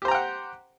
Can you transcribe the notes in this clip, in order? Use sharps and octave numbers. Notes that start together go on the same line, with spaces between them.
G4 C5 F#5 G5 A#5